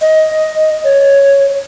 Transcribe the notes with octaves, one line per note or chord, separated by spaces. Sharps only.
D#5
C#5